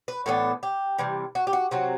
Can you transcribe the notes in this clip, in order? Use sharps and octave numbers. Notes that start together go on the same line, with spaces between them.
B4
A2 E3 B3 D4 A4
G4
C3 E3 G3
F#4
G4
F#4
C3 F#3 C4 F#4